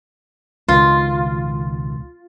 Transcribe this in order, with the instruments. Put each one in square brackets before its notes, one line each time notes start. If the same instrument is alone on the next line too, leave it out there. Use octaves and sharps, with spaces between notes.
[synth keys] C#2 B2 D#3 [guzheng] F4